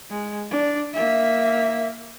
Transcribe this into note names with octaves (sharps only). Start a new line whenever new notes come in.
G#3
D4
A#3 E5